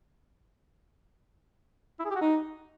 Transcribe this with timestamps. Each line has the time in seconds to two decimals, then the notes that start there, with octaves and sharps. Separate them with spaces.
2.00 E4
2.05 G#4
2.10 G4
2.16 F#4
2.21 D#4